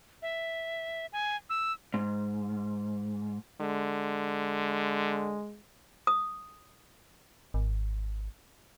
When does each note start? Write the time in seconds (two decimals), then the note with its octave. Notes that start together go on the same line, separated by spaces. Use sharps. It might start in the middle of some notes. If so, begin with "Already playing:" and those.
0.22 E5
1.13 G#5
1.50 E6
1.94 G#2
3.61 D3 G#3
6.07 D#6
7.54 G#1